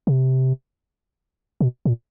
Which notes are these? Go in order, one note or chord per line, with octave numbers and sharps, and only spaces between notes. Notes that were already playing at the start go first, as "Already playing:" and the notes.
C3
B2
A#2